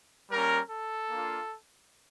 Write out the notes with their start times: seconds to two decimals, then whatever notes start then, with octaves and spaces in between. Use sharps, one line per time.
0.31 G3 A#3 C#4 A#4
0.70 A4
1.11 A#3 D4 F4